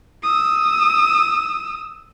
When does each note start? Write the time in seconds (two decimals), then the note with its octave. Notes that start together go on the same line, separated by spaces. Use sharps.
0.23 D#6 E6